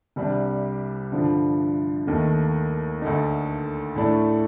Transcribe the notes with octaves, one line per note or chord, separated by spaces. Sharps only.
C2 C3 G3 D4
G2 D3 F3
D#2 D#3 A3
D2 D3 A3 D#4
A2 A3 D4